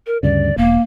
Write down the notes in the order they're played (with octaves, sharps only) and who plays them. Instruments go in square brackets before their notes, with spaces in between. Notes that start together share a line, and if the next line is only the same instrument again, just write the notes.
[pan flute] A#4
[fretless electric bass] D2 G2 C#3 [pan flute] D5
[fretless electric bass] E1 [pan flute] A#3